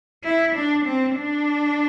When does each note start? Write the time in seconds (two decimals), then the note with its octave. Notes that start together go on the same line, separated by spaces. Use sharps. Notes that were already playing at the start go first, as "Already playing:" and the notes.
0.24 E4
0.54 D4
0.85 C4
1.16 D4